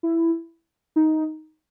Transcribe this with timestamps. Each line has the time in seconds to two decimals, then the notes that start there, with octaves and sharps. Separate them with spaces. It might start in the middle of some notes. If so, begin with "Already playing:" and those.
0.03 E4
0.96 D#4